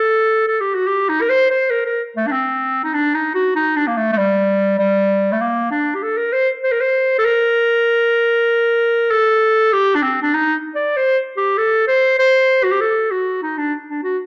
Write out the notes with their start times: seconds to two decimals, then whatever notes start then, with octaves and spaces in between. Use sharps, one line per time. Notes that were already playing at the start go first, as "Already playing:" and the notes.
Already playing: A4
0.47 A4
0.60 G4
0.75 F#4
0.87 G4
1.09 D#4
1.21 A#4
1.29 C5
1.50 C5
1.70 A#4
1.86 A#4
2.17 A3
2.27 D4
2.32 C4
2.84 D#4
2.94 D4
3.15 D#4
3.35 F#4
3.56 D#4
3.76 D4
3.88 A#3
3.97 A3
4.12 A3
4.17 G3
4.79 G3
5.32 A3
5.41 A#3
5.71 D4
5.95 G4
6.03 A4
6.17 A#4
6.33 C5
6.63 C5
6.72 A#4
6.80 C5
7.19 A4
7.25 A#4
9.11 A4
9.73 G4
9.95 D4
10.03 C4
10.22 D4
10.34 D#4
10.75 D5
10.96 C5
11.37 G4
11.57 A4
11.88 C5
12.19 C5
12.64 F#4
12.72 G4
12.81 A4
13.11 F#4
13.42 D#4
13.58 D4
13.89 D4
14.04 F#4